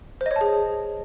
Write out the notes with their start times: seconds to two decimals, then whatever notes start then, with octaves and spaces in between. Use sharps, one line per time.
0.21 C5
0.26 D#5
0.31 C#5
0.36 A5
0.41 G#4